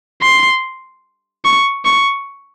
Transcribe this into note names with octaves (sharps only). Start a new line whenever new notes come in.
C6
C#6
C#6